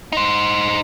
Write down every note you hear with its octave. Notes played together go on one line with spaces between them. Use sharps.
D#4 C5